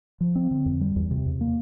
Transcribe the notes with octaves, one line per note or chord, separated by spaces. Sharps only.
F3
C4
D3
F2
G3
E2
C3
E2
A#3